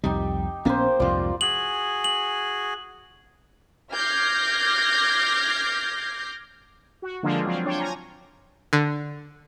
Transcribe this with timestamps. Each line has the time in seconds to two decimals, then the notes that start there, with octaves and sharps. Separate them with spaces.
0.04 C2 F2 G3 D#4 G4
0.65 A#1 A#3 B3 C#4 C5
1.00 C2 F2 G#2 F4 D5 F5
1.41 F#4 G#4 G#5 F#7
2.04 F#7
3.93 D6 F6 G6 G#6 A#6 C7
7.02 F#4
7.23 D3 F3 G#3 A#3 D4 F4
7.43 F3 F#3 C4 F4
7.65 D4 F4 C#5 G5
7.80 G#5 A#5
8.73 D3